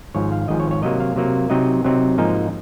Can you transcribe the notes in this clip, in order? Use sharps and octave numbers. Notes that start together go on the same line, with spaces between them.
G#1 G#2 F3 C#5
F5
G#1 G#2 F3 D#5
C#5
C#5
C3 F#3 A#3 D#5
F5
C3 F#3 A#3
C3 F#3 C4 D#4 D#5
C3 F#3 C4 D#4
G#2 F3 A#3 D#4